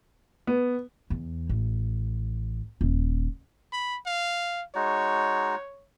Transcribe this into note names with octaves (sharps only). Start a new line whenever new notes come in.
B3
E2
A1
D#1
B5
F5
G#3 D#4 F#4 C#5